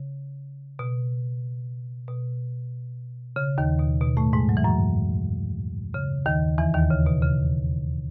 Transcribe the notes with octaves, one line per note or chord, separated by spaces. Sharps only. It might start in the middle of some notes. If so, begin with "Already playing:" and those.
Already playing: C#3
B2
B2
C#3
D#2 D#3
B2
B2
A2 A3
G#2 G#3
F#3
E3
F#2 F#3
C#3
D#2 D#3
E2 E3
D#2 D#3
C#3
B2
C#3